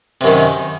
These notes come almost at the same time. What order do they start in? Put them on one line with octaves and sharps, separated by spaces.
C3 F#2 D#3